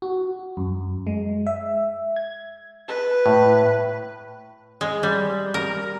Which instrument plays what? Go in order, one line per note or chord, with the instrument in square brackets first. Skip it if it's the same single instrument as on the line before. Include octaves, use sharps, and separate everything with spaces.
[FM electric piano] F#4
F#2
G#3
E5
G#6
[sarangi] B4
[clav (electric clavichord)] A2
[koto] G#3
G3
A#4